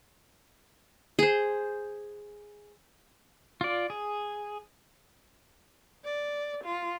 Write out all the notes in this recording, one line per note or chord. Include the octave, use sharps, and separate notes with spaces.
G#4 C5
F4 D5
G#4
D5
F4